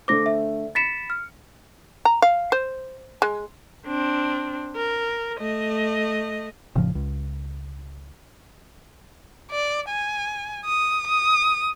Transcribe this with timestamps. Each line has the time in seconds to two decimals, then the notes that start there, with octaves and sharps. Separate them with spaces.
0.08 D3 A3 C5 D6 A#6
0.26 E5
0.75 B5 A6 B6 C#7 E7
1.10 F6
2.05 A#5
2.22 F5
2.52 C5
3.22 G#3
3.86 C4 D4
4.76 A#4
5.37 A3 D#5
6.75 F1 A2 C#3 F3
6.95 C#2
9.51 D5
9.89 G#5
10.65 D#6
11.07 D#6